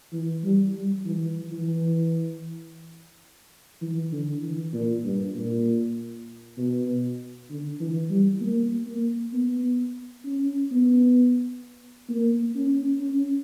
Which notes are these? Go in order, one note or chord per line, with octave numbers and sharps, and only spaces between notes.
E3
G3
G3
E3
E3
E3
D3
E3
A#2
G2
A#2
B2
D3
E3
G3
A#3
A#3
B3
C#4
B3
A#3
C#4
C#4